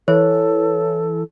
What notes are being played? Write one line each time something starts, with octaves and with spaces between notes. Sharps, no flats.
E3 A4 C#5